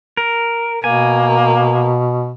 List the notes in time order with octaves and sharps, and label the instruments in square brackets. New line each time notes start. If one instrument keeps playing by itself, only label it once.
[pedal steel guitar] A#4
[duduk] B2 [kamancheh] A#3 [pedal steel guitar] G#5